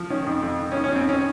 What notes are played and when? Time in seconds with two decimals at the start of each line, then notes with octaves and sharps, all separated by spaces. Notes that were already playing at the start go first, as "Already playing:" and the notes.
Already playing: F3
0.10 D#3 C#4
0.26 F2
0.43 F2
0.59 D#3
0.72 C#4
0.76 D#3
0.84 C#4
0.92 F2 C4
1.08 D#3 C#4